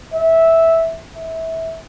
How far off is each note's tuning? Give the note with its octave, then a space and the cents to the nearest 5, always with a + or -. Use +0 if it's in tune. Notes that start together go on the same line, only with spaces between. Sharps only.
E5 -10
E5 -20